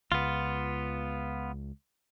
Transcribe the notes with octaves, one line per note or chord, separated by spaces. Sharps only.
C#2 B3 F4